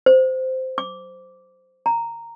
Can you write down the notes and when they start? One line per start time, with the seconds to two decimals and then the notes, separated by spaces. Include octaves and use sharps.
0.06 C5
0.78 D6
1.86 A#5